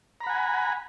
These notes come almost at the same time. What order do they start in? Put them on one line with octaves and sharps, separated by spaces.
A#5 B5 F#5 G#5